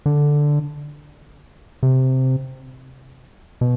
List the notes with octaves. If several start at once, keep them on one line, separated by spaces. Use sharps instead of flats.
D3
C3
B2